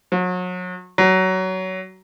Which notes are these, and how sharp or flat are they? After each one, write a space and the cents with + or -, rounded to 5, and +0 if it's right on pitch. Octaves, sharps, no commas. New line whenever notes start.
F#3 -35
F#3 +20